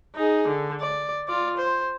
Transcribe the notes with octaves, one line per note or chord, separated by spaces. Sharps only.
D#4 G#4
D3
D5
F4 D5
C5